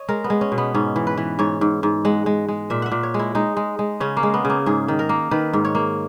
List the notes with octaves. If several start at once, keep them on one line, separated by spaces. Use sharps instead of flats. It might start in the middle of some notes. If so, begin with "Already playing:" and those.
Already playing: C#5 D#5
G#3 A#4
B3
G#3
C#4
B2
B3
G#2 C#4
E3
B4
E3
G#2 C#5
G#2
G#2
G#3 F#5
G#3
G#3
A#2 E5
E5 F#5
A#2
C#5
G#3
E4
G#3 D#4
G#3
G#3
C#3 C#4
A#3
G#3
B3
C#3
A#3
G#2 G#4
D#3
A#4
A#3
D#3 B4
G#2
C#5
A#3